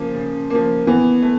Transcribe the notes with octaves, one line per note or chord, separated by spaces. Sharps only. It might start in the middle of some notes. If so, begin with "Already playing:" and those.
Already playing: C#3 F3 A#3
C#3
F3 A#3
E3 B3
A3